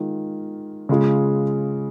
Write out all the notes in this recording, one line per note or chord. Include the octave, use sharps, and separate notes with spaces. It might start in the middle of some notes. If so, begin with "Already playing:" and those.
Already playing: D#3 G#3 F4
C#3 G#3 F4 G#4